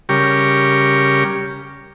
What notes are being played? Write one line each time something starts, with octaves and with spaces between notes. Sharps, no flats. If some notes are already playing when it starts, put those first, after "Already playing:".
C#3 G3 G4 A#4 C#6